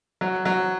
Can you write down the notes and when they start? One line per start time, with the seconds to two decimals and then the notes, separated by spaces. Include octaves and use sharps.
0.21 F#3
0.45 F#3